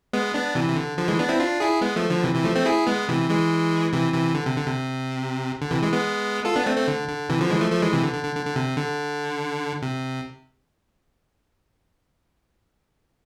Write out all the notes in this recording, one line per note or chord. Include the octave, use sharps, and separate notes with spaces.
G#3 B3
B3 D4
C3 E3
C3
D3
D3 F3
E3 G#3
B3 D4
C4 E4
D4 F4
E4 G#4
G#3 B3
F3 A3
D3 F3
C3 E3
C3 E3
F3 A3
A3 C4
E4 G#4
G#3 B3
C3 E3
E3 G#3
C3 E3
C3 E3
D3
C3
D3
C3
D3
C3 E3
E3 G#3
G#3 B3
F4 A4
B3 D4
A3 C4
A3 C4
D3
D3
C3 E3
D3 F3
E3 G#3
F3 A3
F3 A3
E3 G#3
C3 E3
D3
D3
D3
D3
D3
C3
D3
C3